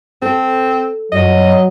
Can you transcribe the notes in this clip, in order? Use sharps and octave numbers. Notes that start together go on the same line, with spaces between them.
C4 A4
F#2 F#3 D#5